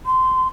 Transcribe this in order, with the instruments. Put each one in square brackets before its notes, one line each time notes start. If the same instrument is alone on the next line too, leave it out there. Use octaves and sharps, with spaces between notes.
[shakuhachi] C6